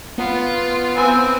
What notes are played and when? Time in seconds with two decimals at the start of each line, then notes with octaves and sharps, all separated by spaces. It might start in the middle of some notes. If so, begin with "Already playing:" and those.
0.18 B3 F4
0.96 C4 B4 G#5 E6